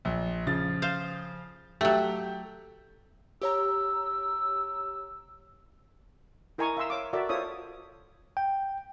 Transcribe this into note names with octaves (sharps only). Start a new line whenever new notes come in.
A#1
C#3 F3 A6
C5 F5
F#3 A3 G4
G4 C#5 A#5 E6
E4 A#4 D#5 G#5 A#5 C#6
E5 F5 G#5 A#5 C6 E6
C#5 F5 D6
F#4 A4 A#4 D5 E5
F4 A4 C5 C#5 E5 D#6
G5